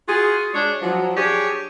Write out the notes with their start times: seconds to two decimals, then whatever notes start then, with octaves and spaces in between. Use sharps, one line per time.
0.07 F4 F#4 G#4
0.53 G#3 D4 C#5
0.81 F3 F#3
1.16 D4 G4 G#4 C#5